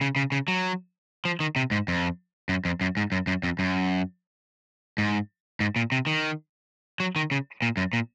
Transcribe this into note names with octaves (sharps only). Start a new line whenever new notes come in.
C#3
C#3
C#3
F#3
F3
D#3
C3
G#2
F2
F#2
F2
F#2
G#2
F#2
F#2
F2
F#2
G#2
G#2
A#2
C3
D#3
F#3
D#3
C#3
A#2
F#2
A#2